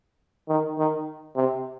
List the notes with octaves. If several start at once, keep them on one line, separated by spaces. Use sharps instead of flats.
D#3
D#3
C3